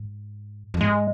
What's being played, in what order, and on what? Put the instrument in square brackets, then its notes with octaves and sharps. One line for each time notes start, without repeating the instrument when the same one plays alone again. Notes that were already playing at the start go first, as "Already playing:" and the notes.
Already playing: [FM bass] G#2
F2
[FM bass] G#2 [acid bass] G#3